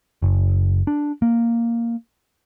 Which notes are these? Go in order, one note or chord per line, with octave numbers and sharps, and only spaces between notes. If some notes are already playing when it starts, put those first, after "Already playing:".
F#1
D4
A#3